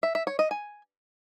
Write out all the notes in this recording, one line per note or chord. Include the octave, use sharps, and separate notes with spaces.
E5
E5
C#5
D#5
G#5